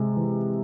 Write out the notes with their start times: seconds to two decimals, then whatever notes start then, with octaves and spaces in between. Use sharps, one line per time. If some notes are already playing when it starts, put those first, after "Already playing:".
Already playing: C3 G#3
0.16 E3